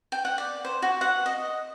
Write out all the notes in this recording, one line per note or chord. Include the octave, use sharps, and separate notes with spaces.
G5
F#5
D5
C5
F#4
F#5
D#5